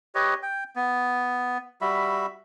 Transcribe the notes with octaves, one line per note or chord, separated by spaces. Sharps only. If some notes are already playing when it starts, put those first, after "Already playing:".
G4 B4 C#5 D#5
G5
B3
G3 F#4 E5 B5